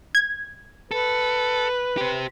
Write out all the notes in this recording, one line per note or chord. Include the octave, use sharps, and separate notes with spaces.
G#6
A4 B4
G4 C5